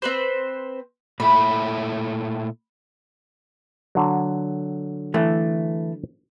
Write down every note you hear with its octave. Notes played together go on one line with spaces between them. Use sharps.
C4 B4 C5
A#2 A3 E4 B5
D3 F#3
E3 A3